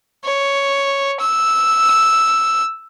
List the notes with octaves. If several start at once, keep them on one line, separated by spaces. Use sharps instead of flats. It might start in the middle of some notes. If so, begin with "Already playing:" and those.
C#5
E6